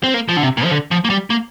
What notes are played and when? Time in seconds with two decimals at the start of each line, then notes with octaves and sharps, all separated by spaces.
0.04 C4
0.14 A#3
0.29 F3
0.37 D3
0.42 C3
0.57 A#2
0.65 F3
0.71 D3
0.91 F3
1.05 A#3
1.10 G3
1.30 A#3